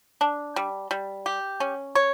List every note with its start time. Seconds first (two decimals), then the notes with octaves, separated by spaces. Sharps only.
0.21 D4
0.56 G3
0.91 G3
1.26 G4
1.60 C#4
1.95 C#5